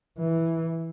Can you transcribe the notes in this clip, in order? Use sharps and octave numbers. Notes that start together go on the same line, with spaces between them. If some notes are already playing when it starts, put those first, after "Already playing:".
E3